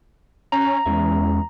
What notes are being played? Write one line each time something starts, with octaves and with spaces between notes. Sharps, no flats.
C#4 A#5
E2 G#3 C#4 E5